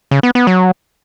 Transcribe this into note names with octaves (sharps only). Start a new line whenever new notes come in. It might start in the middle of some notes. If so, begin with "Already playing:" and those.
C#3
B3
B3
F#3